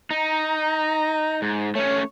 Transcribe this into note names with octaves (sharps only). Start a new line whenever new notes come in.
D#4 A#5
G#2
A3 C#4 C#5